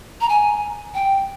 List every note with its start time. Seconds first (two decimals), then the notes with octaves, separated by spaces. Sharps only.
0.21 A#5
0.29 G#5
0.95 G5